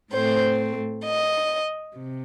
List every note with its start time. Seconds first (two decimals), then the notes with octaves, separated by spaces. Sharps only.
0.11 A2 A3 C4 C5
1.04 D#5
1.95 C3